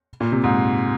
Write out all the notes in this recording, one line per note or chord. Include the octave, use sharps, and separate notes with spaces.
A#2
C3
G#2